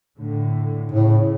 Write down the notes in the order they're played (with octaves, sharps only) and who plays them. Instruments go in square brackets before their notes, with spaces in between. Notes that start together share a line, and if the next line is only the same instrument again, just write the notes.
[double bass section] A2 D3
[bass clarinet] A2 [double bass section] C#3